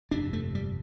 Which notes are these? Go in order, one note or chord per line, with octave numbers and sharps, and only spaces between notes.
G1 F2 C3 D4
A3
G3